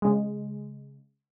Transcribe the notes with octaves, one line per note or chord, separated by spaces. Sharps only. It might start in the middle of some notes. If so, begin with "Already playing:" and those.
C#3 G#3